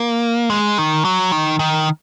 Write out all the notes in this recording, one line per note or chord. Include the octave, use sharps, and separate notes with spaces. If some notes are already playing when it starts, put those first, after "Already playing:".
Already playing: A#3
G#3
D#3
F#3
D#3
D#3